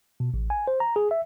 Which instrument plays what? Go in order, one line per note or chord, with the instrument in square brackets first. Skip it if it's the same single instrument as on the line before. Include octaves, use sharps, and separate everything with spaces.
[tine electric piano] B2
A1
G#5
C5
A#5
G#4
E5